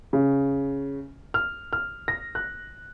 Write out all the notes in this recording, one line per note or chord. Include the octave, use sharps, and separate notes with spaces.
C#3
F6
F6
A#6
F#6